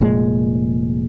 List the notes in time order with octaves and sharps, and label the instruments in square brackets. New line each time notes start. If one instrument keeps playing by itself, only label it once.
[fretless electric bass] F1 A#2 G#3